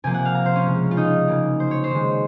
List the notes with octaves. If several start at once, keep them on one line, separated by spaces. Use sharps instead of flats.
C3 F3 A#3 G#5
F#5
F5
A#5
C5
C#4
C#3 G#3
F4
D#4
C#3 F#3 A#3
C5
C#5
C5
D#3 G#3